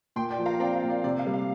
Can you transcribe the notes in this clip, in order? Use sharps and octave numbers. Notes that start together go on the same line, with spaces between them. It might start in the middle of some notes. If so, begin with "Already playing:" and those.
A#2 G5 C6
D5 G5
F3
F5 A#5
C4 D5 G5
F5
A#2
D5
C3 D5
F5
G3
F5